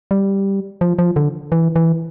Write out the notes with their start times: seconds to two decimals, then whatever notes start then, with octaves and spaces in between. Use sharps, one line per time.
0.11 G3
0.81 F3
0.99 F3
1.16 D3
1.52 E3
1.76 E3